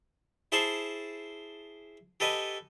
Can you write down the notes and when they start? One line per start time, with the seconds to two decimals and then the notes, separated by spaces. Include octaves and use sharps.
0.52 E4 G#4 C5 A5 C6 C#6
2.20 G4 A4 B4 D#5 G#5